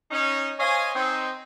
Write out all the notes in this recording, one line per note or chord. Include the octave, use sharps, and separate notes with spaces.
C#4 D#4
C5 C#5 D#5 F5 G#5
C4 D#4